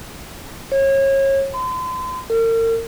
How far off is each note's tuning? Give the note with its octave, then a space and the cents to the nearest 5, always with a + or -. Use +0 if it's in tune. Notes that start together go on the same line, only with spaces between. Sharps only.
C#5 -30
C6 -40
A#4 -40